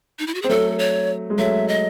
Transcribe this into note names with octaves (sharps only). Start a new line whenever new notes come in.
D#4
E4
F#4
C4 G#4
F#3 A3 A4
C#5
G#3
F#3 A3 E5
D#5